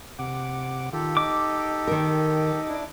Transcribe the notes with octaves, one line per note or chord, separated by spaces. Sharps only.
C3 F#5 D6
D#3 F4 G4 A4
D#4 D#5 D6
D#3 A#4
D4 E4